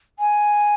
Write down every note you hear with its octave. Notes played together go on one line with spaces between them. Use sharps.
G#5